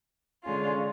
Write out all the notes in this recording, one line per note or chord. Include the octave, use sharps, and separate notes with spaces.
D3 G#3 C#4 F4